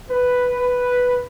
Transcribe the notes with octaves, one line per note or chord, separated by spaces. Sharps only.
B4